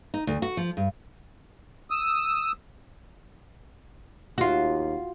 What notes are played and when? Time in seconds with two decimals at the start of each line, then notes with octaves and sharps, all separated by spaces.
0.14 D#4
0.27 D2
0.42 F#4
0.57 F3
0.77 G2
1.90 D#6 E6
4.38 D#2 F4 F#4